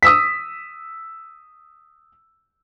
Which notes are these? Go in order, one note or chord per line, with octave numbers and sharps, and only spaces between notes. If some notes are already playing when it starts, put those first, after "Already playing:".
D#6 E6 B6